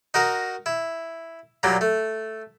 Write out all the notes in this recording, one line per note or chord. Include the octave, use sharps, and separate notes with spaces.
D#4 F#4 A#4
E4
A#2 F#3 G3 A#3
A3